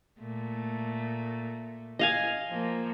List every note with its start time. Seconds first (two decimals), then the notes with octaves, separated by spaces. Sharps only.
0.19 A#2 A3
1.99 D#5 F5 G#5
2.50 F3 A#3